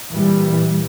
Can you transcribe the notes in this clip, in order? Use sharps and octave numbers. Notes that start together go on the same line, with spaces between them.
A#2 E3 G3